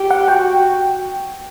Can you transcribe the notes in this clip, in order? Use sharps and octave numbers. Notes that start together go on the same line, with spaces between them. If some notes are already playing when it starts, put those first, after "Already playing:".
Already playing: G4
F#5
F#4 G5